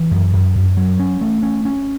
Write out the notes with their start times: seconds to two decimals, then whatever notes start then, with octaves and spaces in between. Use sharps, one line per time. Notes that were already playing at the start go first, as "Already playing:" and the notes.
Already playing: E3
0.11 F#2
0.33 F#2
0.55 F#2
0.77 F#3
1.00 C#4
1.21 A3
1.43 C#4
1.65 C#4